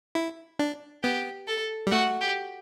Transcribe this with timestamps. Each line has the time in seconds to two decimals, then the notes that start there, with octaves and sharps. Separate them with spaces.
0.15 E4
0.59 D4
1.03 B3 G4
1.47 A4
1.87 G3
1.91 A3 F#4
2.21 G4